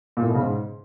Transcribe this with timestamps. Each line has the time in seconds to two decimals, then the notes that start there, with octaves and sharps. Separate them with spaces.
0.17 A#2
0.23 A2
0.29 B2
0.34 C#3
0.40 G#2